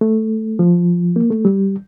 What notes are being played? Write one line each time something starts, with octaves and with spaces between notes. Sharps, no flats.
A3
F3
A#3
A3
G3